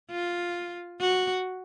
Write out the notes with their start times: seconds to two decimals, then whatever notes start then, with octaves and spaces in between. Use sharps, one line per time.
0.11 F4
1.00 F#4